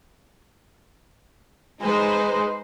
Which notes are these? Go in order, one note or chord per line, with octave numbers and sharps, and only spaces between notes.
G#3 D#4 B4 C5